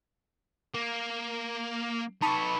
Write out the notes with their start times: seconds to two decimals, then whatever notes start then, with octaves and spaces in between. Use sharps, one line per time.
0.74 A#3
2.22 D#4 B4 A5 B5 C#6